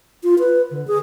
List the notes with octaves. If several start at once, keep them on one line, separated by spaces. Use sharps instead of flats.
F4
B4
D3
G#4